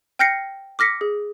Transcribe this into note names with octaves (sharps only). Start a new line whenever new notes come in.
G5 F6 G6 A#6 C7 C#7
D6 F6 A#6 B6 C#7
G#4